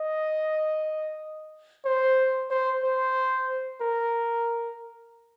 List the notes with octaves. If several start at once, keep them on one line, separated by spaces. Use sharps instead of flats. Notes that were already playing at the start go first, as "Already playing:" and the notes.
Already playing: D#5
C5
C5
C5
A#4